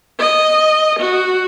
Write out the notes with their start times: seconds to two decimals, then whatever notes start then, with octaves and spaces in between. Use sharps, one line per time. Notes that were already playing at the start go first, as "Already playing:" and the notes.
0.19 D#5
0.99 F#4